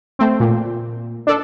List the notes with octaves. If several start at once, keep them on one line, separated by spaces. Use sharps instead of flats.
A3 C4
A#2
D4 A4